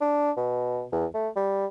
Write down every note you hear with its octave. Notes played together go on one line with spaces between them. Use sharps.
D4
B2
E2
A3
G3